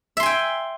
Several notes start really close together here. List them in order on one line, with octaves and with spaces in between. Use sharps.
E5 C6 G#5 G5